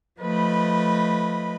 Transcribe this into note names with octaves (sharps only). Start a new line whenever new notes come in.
F3 A3 B4 D#5 B5